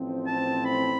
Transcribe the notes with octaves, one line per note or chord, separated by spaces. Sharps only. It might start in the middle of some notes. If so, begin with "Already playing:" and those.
Already playing: A1 A2 F3 C4
A5
B5